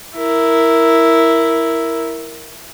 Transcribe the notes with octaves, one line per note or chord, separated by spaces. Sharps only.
E4 A#4